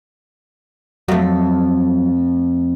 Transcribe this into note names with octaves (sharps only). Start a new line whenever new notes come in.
F2 F#3 A3